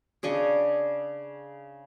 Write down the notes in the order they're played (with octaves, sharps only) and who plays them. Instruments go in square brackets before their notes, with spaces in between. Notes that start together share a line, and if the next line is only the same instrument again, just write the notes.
[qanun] C#3 D4 D#5 C#6